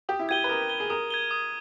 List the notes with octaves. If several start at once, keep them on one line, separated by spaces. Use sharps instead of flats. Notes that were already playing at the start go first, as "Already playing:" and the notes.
G4 D#6
E4
G4 G#6 D#7 G7
B4
A#4 D#6
G#6 D#7 G7
G#4
A#4 D#6
G#6 D#7 G7
D#6